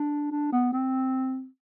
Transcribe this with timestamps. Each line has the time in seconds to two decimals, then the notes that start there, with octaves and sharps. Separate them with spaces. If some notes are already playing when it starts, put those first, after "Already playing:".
Already playing: D4
0.31 D4
0.52 B3
0.73 C4